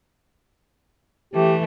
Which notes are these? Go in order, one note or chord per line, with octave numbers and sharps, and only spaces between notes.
E3 A3 G4